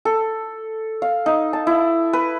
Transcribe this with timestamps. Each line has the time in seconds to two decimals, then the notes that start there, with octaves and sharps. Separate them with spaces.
0.05 A4
1.02 F5
1.26 D#4
1.53 A5
1.67 E4
2.13 B4